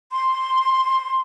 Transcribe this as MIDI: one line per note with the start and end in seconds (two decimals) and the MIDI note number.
0.11 1.20 84